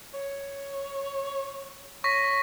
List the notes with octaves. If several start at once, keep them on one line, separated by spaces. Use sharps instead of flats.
C#5
C#5 C#6 A#6 B6